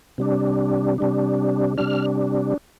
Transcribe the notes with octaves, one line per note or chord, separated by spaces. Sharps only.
C3 G3 D4
C3 G3 D4
C3 G3 D4 F6